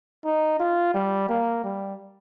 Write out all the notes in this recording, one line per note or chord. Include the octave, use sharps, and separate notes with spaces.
D#4
F4
G3
A#3
G3